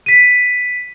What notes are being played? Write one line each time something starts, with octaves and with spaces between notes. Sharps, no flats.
B6 D#7